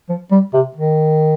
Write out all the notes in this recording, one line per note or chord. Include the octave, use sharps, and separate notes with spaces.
F3
G3
C3
D#3